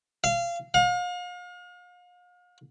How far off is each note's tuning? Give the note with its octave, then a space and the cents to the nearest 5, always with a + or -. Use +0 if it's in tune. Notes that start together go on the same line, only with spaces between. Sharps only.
F5 -25
F5 +40